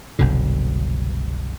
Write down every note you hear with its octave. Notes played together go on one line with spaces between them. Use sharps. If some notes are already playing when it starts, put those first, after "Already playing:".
F#1 C2 B2 D3